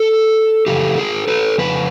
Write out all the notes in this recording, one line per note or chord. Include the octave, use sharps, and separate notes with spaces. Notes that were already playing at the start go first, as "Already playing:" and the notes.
Already playing: A4
F2 C#3 E3 G4 A4
G#4 A#4
A4 B4
F2 C#3 B4